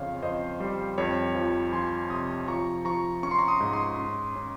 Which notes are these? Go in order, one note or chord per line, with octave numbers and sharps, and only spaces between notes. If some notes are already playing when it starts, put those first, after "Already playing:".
Already playing: F2 C#3 C5 C#5 F5
F2 C5 D#5
G3 C5
F2 C#5
F3
F3 G#5 C6
C3 C6 D#6
F3 A#5 C#6
F3 A#5 C#6
C#4 C#6
C6
A#5 C#6
C6 D#6
G#2
C6 D#6
C#4
C#4